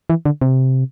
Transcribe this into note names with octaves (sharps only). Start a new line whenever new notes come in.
E3
D3
C3